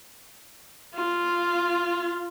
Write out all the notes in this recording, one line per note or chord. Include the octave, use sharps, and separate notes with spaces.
F4